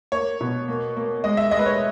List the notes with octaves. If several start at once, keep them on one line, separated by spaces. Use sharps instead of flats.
A#3 C#5
B2
A#3
A#3
G#3 D#5
E5
G#3 D#5
B4
C#5